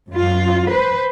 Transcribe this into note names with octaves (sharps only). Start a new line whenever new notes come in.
F#2 F4
B4 C5